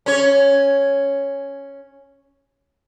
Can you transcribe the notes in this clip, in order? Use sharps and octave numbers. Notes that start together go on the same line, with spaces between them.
C#4 C#5